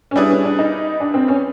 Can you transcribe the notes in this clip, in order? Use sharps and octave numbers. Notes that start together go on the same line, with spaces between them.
C#4
G3 B3 D4 E4 G#4 B4
C#4
D4
D#4
D4
C4
C#4